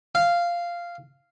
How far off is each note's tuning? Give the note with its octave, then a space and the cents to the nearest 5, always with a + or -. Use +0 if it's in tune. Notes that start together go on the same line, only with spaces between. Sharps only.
F5 -10